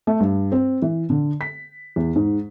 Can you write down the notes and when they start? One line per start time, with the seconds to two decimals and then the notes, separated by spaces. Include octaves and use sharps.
0.07 A3
0.20 G2
0.52 C4
0.82 E3
1.10 D3
1.41 B6
1.96 E2
2.16 G#2